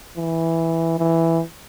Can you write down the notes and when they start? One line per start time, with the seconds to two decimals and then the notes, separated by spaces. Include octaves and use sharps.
0.17 E3
0.99 E3